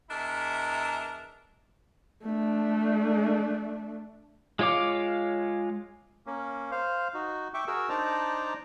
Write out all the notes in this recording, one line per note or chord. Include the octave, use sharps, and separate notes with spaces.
E2 D4 E4 A#4 D#5 E5
A3 D4
G#3 F4 C#5 F5 D6
A#3 C#4
C5 F5
D#4 F#4
E5 G5 C#6 D6
F#4 G#4 A#4 E6
D4 D#4 C5 D5 A5 A#5